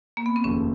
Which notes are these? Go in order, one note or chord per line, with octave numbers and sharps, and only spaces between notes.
A#3
B3
C4
F1 D#2 C#3 F3 A3 C#4